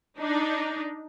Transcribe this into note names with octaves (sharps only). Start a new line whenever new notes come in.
D4 D#4